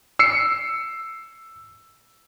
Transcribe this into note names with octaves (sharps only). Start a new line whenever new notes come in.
E6 C7 C#7